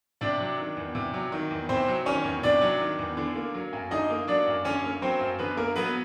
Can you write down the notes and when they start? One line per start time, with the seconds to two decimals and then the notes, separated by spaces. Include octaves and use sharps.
0.21 C3 D4 D5
0.40 F#3
0.58 D#3
0.77 E2
0.95 C3
1.14 F#3
1.32 D#3
1.50 E2
1.69 C3 C4 C5
1.88 F#3
2.06 D#3 C#4 C#5
2.24 E2
2.43 C3 D4 D5
2.61 F#3
2.80 D#3
2.98 E2
3.17 D3
3.36 A#3
3.54 F#3
3.73 F#2
3.91 D3 D#4 D#5
4.10 A#3
4.28 F#3 D4 D5
4.47 F#2
4.65 D3 C#4 C#5
4.84 A#3
5.02 F#3 C4 C5
5.21 F#2
5.39 D3 B3 B4
5.57 A#3 A#4
5.76 F#3 B3 B4